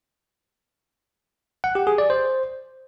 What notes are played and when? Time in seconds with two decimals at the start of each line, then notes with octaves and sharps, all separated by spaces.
1.64 F#5
1.75 G4
1.87 G#4
1.98 D5
2.10 C5